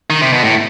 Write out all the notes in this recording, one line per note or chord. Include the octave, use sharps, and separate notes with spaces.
D#3
C3
B2
A2